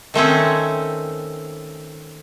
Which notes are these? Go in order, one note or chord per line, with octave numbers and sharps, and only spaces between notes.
D#3 A3 C4 C#4